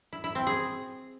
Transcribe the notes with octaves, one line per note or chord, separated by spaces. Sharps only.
E4
E4
C4
G#4